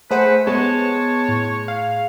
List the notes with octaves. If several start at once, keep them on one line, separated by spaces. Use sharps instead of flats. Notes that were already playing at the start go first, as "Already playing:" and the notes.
A3 G#4 B4 C5 F#5
G#3 B3 C#5 A5
A2
F5